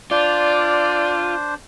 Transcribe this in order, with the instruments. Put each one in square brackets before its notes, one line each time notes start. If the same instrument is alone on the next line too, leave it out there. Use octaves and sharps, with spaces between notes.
[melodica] D4 C5 [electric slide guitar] F4 [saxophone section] D5